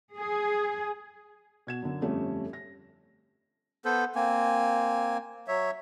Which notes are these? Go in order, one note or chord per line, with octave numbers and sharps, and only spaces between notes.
G#4
B2 G#6 E7
F#2 D3
G1 F2 G3 A3 C#4
A#6
B3 A4 C5
A#3 C4 G#5
F#3 C#5 E5